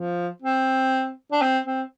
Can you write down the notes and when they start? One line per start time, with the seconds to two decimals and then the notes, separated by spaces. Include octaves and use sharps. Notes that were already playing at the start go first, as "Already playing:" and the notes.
Already playing: F3
0.42 C4
1.32 D4
1.42 C4
1.65 C4